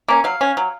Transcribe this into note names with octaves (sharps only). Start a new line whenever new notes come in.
A#3 C#4
F#3 F5
C#4
F#3